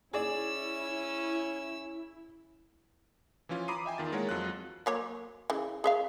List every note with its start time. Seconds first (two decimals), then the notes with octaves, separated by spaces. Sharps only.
0.14 C#4 E4 G#4 D5 E6
3.49 E3 F3 C#4 F4
3.68 A#5 B5 D6 D#6 C7 D#7
3.85 D#5 E5 G5 G#5
3.98 E2 D#3 F4 A6
4.12 G#3 A#3 E4 A#4 C#5 F#5
4.29 F2 F#3 F4 F#6
4.86 F#3 A#3 C#5
5.50 C#3 E3
5.84 G#4 E5 F5